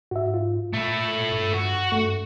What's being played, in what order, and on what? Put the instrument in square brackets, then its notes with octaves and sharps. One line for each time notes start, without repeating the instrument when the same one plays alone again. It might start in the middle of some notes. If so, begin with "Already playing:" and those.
[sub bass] G#2 [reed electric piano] F#4 E5
[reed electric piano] F4
[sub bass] A#2 [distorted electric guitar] A3 E4
[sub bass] G2
[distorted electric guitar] F#4
[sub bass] G2 [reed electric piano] A3